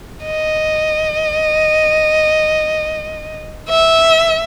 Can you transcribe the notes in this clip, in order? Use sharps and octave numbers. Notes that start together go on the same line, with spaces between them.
D#5
E5